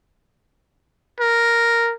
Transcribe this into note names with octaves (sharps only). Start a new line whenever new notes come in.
A#4